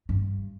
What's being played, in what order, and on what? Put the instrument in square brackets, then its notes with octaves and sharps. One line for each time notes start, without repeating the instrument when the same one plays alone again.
[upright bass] G2